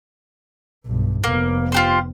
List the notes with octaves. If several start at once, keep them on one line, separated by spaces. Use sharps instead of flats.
B1 G2
F1 A#3 B3
F4 G4 C5